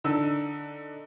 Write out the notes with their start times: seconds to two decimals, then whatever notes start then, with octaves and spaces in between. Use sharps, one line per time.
0.04 D3 D4 D#4 E6